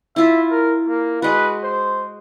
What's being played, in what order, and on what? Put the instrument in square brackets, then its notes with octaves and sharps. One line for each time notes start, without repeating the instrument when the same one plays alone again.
[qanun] E4 F4 [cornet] E5
[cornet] A#4
A#3
[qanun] G#3 F#4 [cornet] B4
[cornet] C5